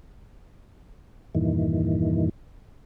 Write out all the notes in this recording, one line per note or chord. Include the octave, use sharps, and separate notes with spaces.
E2 G2 A#2 D#3 E3